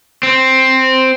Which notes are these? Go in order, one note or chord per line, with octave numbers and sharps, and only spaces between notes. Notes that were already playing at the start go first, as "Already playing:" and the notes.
C4